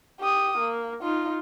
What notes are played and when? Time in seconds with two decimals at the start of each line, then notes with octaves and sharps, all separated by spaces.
0.20 G4 D#6
0.58 A#3
1.02 D#4 F4